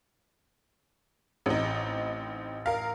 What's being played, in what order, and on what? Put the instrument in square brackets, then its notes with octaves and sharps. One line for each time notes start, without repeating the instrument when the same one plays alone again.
[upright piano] A1 [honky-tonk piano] C4 D#4
[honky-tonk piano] A#4 F5